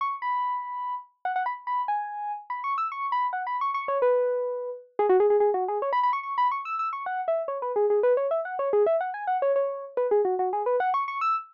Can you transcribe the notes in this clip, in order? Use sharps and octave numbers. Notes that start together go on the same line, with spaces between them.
C#6
B5
F#5
F#5
B5
B5
G#5
B5
C#6
E6
C#6
B5
F#5
B5
C#6
C#6
C#5
B4
G#4
F#4
G#4
G#4
G#4
F#4
G#4
C#5
B5
B5
C#6
C#6
B5
C#6
E6
E6
C#6
F#5
E5
C#5
B4
G#4
G#4
B4
C#5
E5
F#5
C#5
G#4
E5
F#5
G#5
F#5
C#5
C#5
B4
G#4
F#4
F#4
G#4
B4
F#5
C#6
C#6
E6